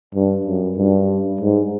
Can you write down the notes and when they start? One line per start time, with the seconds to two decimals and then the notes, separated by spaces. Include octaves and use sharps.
0.15 G2
0.46 F#2
0.78 G2
1.41 G#2